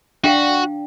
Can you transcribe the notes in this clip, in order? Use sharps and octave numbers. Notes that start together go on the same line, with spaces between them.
D4 F#4 F5 G5